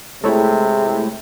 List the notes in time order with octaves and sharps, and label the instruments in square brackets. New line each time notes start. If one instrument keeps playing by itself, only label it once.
[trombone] C3 [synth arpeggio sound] G#3 A3 E4 [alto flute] G#4 [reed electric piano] A4 C#5